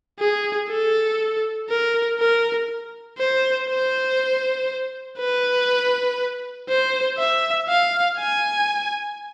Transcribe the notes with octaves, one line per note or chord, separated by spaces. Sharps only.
G#4
A4
A#4
A#4
C5
C5
B4
C5
E5
F5
G#5